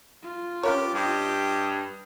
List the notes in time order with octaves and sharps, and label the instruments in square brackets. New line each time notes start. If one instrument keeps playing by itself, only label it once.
[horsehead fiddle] F4
[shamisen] C#4 B4 C#5 [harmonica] G4
[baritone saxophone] G2 [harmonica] G4 D#5